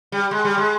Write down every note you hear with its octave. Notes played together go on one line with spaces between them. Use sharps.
G3
G#3
G3
G#3